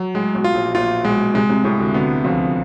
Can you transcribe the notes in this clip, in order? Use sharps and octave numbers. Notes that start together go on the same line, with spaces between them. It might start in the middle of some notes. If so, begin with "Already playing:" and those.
Already playing: F#3
A2 G#3
B1 B2
F4
A#1 A#2
A#1 A#2 F4
B1 B2 G#3
C2 C3 G#3
C2 C3
C2 A2 C3
D2 D3
D2 D3 B3
C#2 C#3 F3